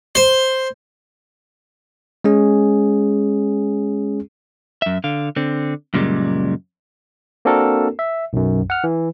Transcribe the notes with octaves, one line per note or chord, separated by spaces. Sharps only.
C5
G#3 C#4 G#4
F#2 E5
D3 F5
D3 C4
F#2 A#2 C#3 G3 G#3
A#3 C4 D4 F#4 A4 A#4
E5
B1 F#2
F#5 F6
E3